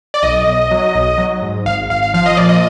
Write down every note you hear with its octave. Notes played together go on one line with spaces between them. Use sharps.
D5
B1 D#5
B1
F#3
B1
F#3
G#2
G#1 F5
G#1 F5
F5
F3 F5
D#5
A#2 D5
D#5